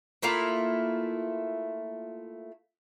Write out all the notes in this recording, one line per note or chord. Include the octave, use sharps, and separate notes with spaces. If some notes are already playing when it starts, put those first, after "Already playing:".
A3 A#3 E4 F4